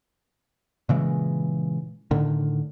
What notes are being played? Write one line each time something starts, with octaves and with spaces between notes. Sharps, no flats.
A#2 C#3 E3 G#3
A2 D3 D#3